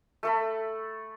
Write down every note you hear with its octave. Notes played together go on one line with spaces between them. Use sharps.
A3 A4 B5